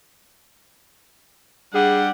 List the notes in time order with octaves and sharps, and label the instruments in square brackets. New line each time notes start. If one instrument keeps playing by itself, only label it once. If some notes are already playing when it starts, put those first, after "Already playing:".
[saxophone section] G3 D4 [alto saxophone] G#4 [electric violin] F#5